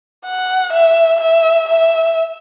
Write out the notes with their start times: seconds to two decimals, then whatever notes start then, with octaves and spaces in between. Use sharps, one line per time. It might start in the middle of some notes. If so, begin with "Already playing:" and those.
0.25 F#5
0.73 E5
1.21 E5
1.69 E5